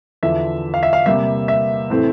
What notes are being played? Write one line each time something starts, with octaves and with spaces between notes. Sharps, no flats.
E2 D3 F3 E5
F5
E5
F5
C3 G3 A#3 E5
E5
A2 E3 A3 C4